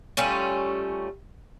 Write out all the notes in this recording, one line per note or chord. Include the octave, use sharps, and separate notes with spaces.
G3 A3 C#4 F4